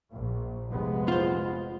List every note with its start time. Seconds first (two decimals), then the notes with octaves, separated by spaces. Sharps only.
0.11 A#1
0.69 F1 G#3 B3
1.08 F4 C5